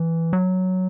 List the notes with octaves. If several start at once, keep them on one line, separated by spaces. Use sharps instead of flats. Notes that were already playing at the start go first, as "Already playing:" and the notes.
Already playing: E3
F#3